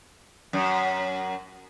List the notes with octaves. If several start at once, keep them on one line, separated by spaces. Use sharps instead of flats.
F#2